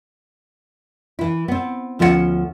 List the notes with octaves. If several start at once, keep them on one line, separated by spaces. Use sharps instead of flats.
E3 E4
B3 C4
D2 F3 B3 C#4 A#4 F#5